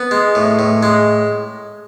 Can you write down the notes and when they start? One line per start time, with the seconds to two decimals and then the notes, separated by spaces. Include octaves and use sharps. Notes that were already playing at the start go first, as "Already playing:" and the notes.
Already playing: B3
0.11 G#3
0.35 A2
0.59 A2
0.83 G#3